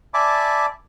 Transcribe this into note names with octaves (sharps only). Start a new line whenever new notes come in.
D5 E5 G#5 A5 B5 D6